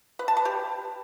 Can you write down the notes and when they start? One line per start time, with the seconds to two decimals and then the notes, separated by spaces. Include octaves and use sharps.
0.19 B4
0.28 A5
0.37 B4
0.45 G4